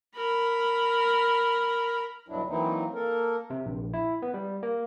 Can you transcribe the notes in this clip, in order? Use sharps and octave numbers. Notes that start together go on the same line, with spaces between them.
A#4 B5
D2 G2 B2 F#3 D4 E4
E3 F#3 A#3 C4 D#4 E4
A#3 A4 A#4
C3
A#1
E4
B3
G3
A#3